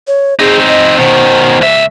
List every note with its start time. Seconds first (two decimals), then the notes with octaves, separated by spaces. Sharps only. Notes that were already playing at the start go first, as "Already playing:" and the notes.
0.07 C#5
0.39 C4 D#4 G#4
0.69 D#5
0.98 B2 D#3 C5
1.61 C#2 E5